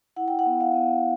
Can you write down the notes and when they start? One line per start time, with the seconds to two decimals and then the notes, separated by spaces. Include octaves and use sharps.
0.16 E4 F#5
0.28 G5
0.39 F#5
0.46 B3
0.61 F5
0.75 B3